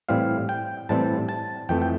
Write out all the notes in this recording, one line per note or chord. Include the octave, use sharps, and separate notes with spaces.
A2 E3 G3 C4 F5
G5
A2 E3 G3 C4 A5
A5
F2 E3 A3 G5
G5